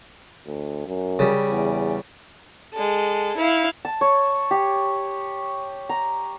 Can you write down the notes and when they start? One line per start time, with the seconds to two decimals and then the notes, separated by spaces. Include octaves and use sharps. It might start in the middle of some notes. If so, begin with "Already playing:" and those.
0.46 D2
0.87 F#2
1.19 C#3 G3
1.50 E2
2.73 G#3 A4
3.37 E4 F5
3.85 A5
4.01 C#5
4.51 G4
5.89 A#5